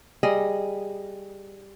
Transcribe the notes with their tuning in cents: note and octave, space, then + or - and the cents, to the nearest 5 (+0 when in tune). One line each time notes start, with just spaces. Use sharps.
G3 +5 G#4 +0 D#5 +0